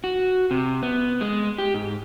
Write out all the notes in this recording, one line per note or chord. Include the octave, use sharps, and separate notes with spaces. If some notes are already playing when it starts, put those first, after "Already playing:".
F#4
C3
B3
G#3
G4
G#2